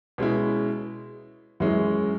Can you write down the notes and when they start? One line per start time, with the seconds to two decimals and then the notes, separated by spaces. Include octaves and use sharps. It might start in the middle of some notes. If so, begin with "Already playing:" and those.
0.18 B2 G#3 C#4 E4
1.60 F#2 E3 G#3 C#4